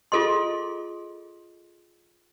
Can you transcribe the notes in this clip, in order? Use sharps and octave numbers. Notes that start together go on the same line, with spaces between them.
F4 G#4 A4 D#5 C6